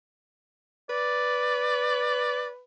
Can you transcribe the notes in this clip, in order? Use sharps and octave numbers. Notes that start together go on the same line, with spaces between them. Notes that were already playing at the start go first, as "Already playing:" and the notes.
B4 D5